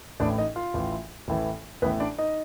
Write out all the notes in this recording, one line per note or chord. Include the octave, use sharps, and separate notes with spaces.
A1 A2 E3 D4 D5
D#4 D#5
F4 F5
A1 A2 E3
A1 A2 E3
A1 A2 E3 B3 B4
D4 D5
D#4 D#5